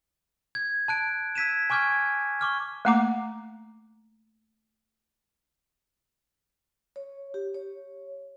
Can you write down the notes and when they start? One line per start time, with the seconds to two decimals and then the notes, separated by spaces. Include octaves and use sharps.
0.55 G#6
0.88 A5 F#6 D7
1.35 E6 G#6 B6 D#7 E7
1.70 G#5 C#6 D6 F6 G6 G#6
2.40 C#6 D6 F6 G#6
2.85 A3 A#3 F#5 A#5 D6
6.96 C#5
7.34 G4
7.54 C#5